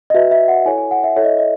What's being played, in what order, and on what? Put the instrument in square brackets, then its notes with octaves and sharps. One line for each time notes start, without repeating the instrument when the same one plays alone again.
[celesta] D#5
F#4 B4 E5
E5
F#5
E4 A4 C#5 G#5
G#5
F#5
E5
E4 A4 C#5 E5
D#5
D#5